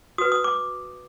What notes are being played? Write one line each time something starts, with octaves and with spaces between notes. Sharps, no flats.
F#4 B4 D#6
D#6
D6